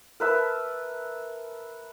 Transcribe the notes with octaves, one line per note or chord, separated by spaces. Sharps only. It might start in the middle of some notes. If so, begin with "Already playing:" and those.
A#4 B4 E5 A5